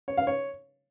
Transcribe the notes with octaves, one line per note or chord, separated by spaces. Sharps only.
C#5
F5
C#5